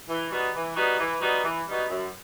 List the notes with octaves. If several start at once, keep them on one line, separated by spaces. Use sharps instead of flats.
E3
G3 B3 D#4 F#4
E3
G3 B3 D#4 F#4
E3
G3 B3 D#4 F#4
E3
G3 B3 D#4 F#4
F#2